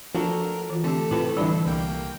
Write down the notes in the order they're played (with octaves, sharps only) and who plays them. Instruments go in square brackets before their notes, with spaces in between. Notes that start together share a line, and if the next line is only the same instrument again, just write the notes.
[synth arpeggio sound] F3 [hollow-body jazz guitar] D4 F#4 A4 [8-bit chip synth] A#4
[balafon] E3 F4
[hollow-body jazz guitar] D3 [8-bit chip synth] A3 A4 [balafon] C4 G4
[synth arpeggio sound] A2 [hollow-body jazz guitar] C3 B4 A5 [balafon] E4 F4
[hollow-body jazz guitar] D3 [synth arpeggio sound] E3 D5 [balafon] G3 D4 B5
[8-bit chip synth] C2 A#3 G5